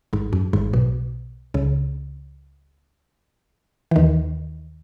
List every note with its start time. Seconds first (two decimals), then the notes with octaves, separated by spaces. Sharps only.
0.13 G#1 G#2
0.33 F#2
0.53 G#1 G#2
0.73 B1 B2
1.54 C#2 C#3
3.91 E3
3.96 D#2 D#3